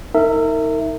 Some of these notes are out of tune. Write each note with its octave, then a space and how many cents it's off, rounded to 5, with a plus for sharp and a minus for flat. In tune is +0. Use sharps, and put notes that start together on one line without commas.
D#4 +30 A#4 -30 E5 +0